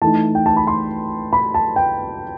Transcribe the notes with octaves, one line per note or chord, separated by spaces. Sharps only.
E3 A3 D#4 A5
G5
A5
B5
C6
B5
A5
G5